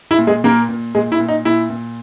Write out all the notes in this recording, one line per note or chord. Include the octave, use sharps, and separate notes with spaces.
E4
A#2
G#3 G#4
A#2 A#3 A#4
A#2
A#2 G#3 G#4
E4
A#2
D#4
A#2 E4
A#2